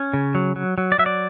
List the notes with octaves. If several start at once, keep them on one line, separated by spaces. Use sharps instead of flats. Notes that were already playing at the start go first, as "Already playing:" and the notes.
Already playing: C#4
C#3
F#3
F#3
F#3
D5
F#3 E5
D5